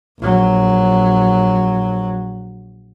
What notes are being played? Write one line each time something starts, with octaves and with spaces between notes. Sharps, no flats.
A#1 F#3